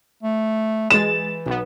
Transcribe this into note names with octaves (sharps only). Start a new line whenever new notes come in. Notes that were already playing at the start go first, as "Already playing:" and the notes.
A3
E3 G#3 A6 E7
B1 B3